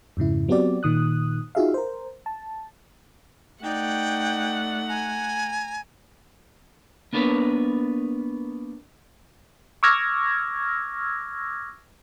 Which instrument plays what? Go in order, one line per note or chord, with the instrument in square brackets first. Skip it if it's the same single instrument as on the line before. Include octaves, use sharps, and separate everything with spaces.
[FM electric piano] F2 G#2 C#3 E4
F#3 B3 C4 F#4 G4 D5
A#2 D#3 D#6 F#6
D#4 F4 F#4 G#4 E5 F5
A#4 C5
A5
[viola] A3 F#5 [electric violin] D#4 D5 [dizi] G5
[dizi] G#5 [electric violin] A#5
[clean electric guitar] A#3 B3 D4 A#4 B4 C#5
[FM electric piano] C#6 D6 E6 F6 G#6 A#6